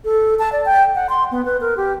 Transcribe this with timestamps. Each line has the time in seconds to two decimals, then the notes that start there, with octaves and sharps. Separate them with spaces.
0.05 A4
0.39 A5
0.52 D5
0.65 G5
0.95 F#5
1.09 C6
1.31 B3
1.45 B4
1.61 A#4
1.77 G4